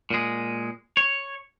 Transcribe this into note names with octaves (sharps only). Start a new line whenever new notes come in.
A#2 G#3
C#5